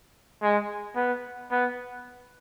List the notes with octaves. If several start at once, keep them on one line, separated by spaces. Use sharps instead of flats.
G#3
B3
B3